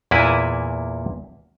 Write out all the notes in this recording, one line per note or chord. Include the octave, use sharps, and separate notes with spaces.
E2 A#2 A#3 E4 B4 G#5